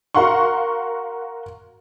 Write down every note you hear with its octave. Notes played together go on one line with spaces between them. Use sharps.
F#4 A#4 F5 F#5 C6 C#6